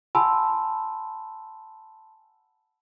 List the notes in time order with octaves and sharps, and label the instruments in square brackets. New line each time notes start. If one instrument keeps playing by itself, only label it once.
[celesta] F#5 G#5 A5 B5 C6 E6